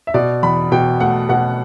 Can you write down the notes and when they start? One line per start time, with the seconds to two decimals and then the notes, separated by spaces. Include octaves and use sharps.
0.07 E5
0.14 B2 D5
0.43 E2 B5
0.72 B2 G5
1.00 A3 F#5
1.29 B2 F#5